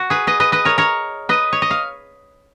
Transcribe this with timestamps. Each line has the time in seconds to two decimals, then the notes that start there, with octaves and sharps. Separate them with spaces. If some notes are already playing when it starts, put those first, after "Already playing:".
Already playing: F#4
0.10 G#4 B4
0.27 B4 D#5
0.40 B4 D#5
0.52 B4 D#5
0.65 A#4 C#5
0.78 A#4 C#5
1.29 B4 D#5
1.53 C#5
1.62 D#5
1.71 F5